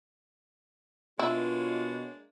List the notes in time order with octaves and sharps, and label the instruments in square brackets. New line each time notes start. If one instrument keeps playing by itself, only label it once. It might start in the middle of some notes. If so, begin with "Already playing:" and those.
[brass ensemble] B2 C#5 [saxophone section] G#3 A#3 D4 [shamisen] E4 [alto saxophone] F4